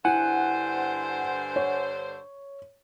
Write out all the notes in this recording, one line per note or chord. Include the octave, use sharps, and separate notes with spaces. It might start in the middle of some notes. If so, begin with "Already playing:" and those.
G2 D3 E4 C5 F#5 G#5
C#5